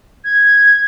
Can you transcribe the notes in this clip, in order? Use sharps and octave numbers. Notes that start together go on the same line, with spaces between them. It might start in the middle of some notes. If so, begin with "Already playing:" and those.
G#6